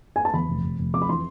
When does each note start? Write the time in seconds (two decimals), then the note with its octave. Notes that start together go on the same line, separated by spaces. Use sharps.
0.16 G#5
0.25 A5
0.33 E2 B5
0.48 F1
0.63 F1
0.78 F1
0.94 F2 D6
1.02 B5
1.09 E3 C6